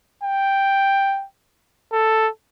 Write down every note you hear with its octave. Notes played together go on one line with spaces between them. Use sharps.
G5
A4